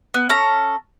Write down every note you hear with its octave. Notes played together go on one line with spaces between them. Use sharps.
B3
C#4 A4 A#5